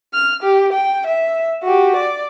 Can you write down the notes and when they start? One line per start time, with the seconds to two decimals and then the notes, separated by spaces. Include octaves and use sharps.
0.14 F6
0.43 G4
0.72 G5
1.07 E5
1.63 F#4 G4
1.96 D5